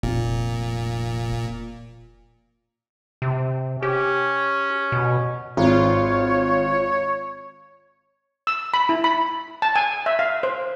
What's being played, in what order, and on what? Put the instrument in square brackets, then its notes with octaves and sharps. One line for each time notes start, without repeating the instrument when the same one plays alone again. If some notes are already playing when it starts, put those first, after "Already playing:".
[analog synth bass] F1 [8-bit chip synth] A#2
[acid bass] C3
[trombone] C#4 [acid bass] G4
[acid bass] B2
[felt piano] G#1 [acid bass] F4 [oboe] C#5
[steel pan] E6
B5
E4
B5
A5
G#5
E5
F5
C5